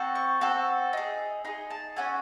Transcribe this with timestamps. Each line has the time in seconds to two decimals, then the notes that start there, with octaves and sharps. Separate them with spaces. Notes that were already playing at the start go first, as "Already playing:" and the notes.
Already playing: C4 F#4 A4
0.15 C#6
0.41 C4 F#4 A4
0.93 D#4 G#4
1.45 D#4 G#4 C6
1.70 A5
1.96 C#4 F#4 A4 G#5